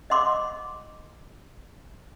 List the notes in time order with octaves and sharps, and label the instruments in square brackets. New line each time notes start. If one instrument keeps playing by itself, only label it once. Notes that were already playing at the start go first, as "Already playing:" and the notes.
[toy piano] D#5 F#5 C6 D6